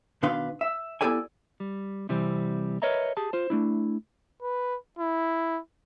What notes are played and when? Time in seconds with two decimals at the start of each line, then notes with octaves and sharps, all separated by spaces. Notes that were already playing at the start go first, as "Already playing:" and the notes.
0.23 B2 D#3 D4 B4 F5 C6
0.61 E5
1.01 B3 E4 G4 A4 D5 G#5
1.60 G3
2.09 C3 E3 G3 C4
2.82 A#4 B4 C#5 D#5 E5 A#5
3.17 G4 G#4 A5
3.33 F4 C5
3.50 A3 D4 E4
4.42 B4
4.99 E4